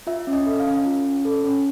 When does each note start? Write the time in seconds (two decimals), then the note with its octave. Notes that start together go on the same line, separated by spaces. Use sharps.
0.07 F4 E5
0.27 C#4
0.33 D#5
0.46 A4
0.60 F5
0.66 C#4
0.86 F4
1.05 C#4
1.25 A4
1.44 C#4